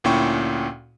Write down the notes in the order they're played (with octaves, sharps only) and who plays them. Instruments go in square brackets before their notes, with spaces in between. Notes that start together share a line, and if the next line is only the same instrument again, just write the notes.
[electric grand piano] D2 A#2 C#4 E4 G5 C#6